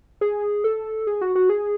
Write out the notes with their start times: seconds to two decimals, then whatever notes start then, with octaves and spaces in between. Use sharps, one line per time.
0.21 G#4
0.64 A4
1.07 G#4
1.21 F#4
1.35 F#4
1.49 G#4